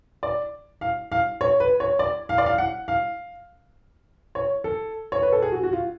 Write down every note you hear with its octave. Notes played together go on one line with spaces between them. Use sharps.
D5
F5
F5
C#5
B4
C#5
D5
F5
D5
F5
F#5
F5
C#5
A4
C#5
B4
A4
G#4
F#4
F#4
F4